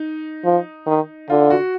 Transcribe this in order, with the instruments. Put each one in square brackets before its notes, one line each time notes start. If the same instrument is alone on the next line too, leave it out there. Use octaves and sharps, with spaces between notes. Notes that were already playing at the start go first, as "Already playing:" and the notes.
Already playing: [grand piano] D#4
[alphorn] F3
D#3
[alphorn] D3 [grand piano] F4
[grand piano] F#4